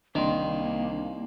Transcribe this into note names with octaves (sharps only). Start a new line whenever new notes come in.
C2 D#3 A#3 D4 C6